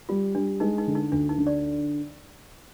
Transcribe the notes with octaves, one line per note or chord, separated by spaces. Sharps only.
G3 F4
G3 D4
G#3 D#4
D#4
D3
D#4
D2 D4
D#4
D3
D5